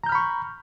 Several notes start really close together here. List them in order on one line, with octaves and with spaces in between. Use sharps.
A#5 G6 F6 B5 C#6